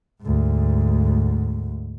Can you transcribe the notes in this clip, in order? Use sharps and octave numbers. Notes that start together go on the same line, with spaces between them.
D2 G#2